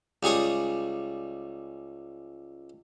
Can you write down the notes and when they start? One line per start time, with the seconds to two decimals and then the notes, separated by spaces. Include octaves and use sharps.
0.23 C#2 G3 G#4 C#6 D#6